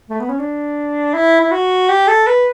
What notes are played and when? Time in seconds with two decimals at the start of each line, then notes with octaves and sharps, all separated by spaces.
0.09 A3
0.20 B3
0.29 C#4
0.39 D4
1.14 E4
1.41 E4
1.51 F#4
1.89 G4
2.07 A4
2.27 B4